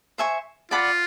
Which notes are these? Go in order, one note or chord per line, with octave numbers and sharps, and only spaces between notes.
C5 E5 G#5 C#6
F4 D5 F#5 B5 D6